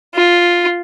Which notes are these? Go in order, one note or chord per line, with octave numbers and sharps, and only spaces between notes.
F4